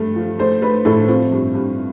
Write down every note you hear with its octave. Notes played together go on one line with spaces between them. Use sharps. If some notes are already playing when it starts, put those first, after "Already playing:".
Already playing: G2 A3
F3
A3 C5
A3 B4
A2 A4
F3 C4
G2
G2